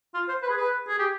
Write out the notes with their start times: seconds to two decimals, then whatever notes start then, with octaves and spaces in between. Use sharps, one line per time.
0.14 F4
0.28 C5
0.42 B4
0.49 G#4
0.57 B4
0.88 G#4
0.99 G4